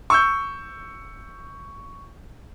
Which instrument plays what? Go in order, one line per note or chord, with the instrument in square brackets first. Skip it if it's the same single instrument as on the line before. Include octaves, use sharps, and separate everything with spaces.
[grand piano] C#6 E6 G6